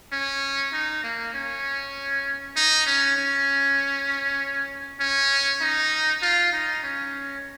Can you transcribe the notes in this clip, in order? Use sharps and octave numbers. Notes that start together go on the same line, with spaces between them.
C#4
D#4
A#3
C#4
D#4
C#4
C#4
C#4
D#4
F4
D#4
C#4